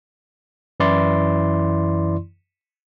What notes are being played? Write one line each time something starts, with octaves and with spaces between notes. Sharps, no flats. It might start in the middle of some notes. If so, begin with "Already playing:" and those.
F#2 E3 E4 D5 C6